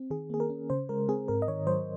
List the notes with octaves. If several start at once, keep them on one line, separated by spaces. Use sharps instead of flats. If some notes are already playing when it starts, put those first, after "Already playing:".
Already playing: C4
D#3 G#4
A#3 G#4
A#4
C#4
C#3 C5
G#3 A#4
C4 G#4
G#2 A#4
D#5
D#3 C#5
F#3 C5